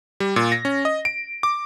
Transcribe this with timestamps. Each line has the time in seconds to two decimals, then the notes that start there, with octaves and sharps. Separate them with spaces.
0.20 G3
0.36 A#2
0.52 A#6
0.65 C#4
0.85 D#5
1.05 D7
1.43 D6